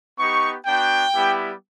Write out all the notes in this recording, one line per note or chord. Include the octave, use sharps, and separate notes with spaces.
B3 D#4 G4 C#6
B3 D4 F#4 G5
G3 B3 E4 G4